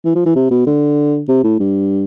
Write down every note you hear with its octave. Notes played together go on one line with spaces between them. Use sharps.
E3
F3
E3
C3
B2
D3
C3
A2
G2